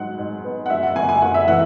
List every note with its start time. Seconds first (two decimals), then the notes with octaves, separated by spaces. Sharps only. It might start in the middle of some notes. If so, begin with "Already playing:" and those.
Already playing: G#2 F#3 F#5
0.18 G#2
0.44 B3
0.66 F#5
0.70 F#2 E5
0.83 F#5
0.96 F#1 G#5
1.09 G#5
1.22 F#1 F#5
1.34 E5
1.48 E3 F#5